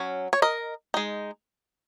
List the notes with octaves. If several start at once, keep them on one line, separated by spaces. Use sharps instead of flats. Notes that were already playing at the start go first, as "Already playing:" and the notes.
Already playing: F#3 C#4
C#5
A#4 D#5
G#3 D#4